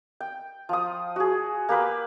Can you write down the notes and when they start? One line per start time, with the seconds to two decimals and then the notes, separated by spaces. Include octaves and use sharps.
0.20 G5
0.69 F3 D#6
1.16 F#4 G#4
1.69 A#3 G4 B4